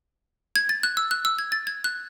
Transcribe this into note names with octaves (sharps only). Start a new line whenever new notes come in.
G#6
A6
F#6
E6
F#6
E6
G#6
A6
G#6
F#6